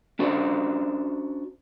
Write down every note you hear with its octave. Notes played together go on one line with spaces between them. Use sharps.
C#4 D4 F#4 C5 D5